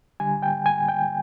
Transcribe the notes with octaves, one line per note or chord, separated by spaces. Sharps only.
D3 G3 G#5
G5
G#5
G5